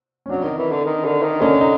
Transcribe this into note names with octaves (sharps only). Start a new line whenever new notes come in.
C#4
F#3 C4 D4
D#3
E3
D3
D#3
D3
D#3
D3 C#4 D#4
D#4